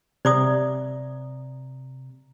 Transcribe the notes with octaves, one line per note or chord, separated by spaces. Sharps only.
C3 D5 A#5 D6 D#6